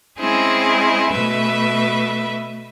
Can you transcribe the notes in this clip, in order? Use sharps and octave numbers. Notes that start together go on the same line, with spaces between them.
G#3 C4 C#4 E4 G#4
B2 A3 B4 E5